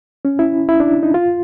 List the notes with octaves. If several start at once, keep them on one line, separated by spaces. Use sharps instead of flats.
C#4
E4
E4
D4
D#4
F4